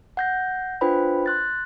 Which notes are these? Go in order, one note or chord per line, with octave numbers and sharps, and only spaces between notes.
F#5 G6 A#6
D4 F4 B4 C5 G5 B5
C6 F#6 A6